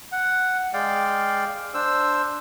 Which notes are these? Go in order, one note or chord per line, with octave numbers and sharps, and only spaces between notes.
F#5
G#3 D5 F5 G5
D4 C5 E6